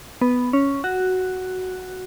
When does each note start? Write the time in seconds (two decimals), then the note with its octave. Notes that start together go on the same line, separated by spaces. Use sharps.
0.21 B3
0.53 C#4
0.84 F#4